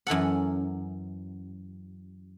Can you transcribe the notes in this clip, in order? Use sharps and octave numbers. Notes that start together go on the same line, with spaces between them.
F#2 E3 A4 F#5